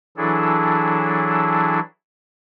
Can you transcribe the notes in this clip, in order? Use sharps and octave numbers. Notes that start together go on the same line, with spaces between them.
E3 F#3 D4 E4 G#4 A4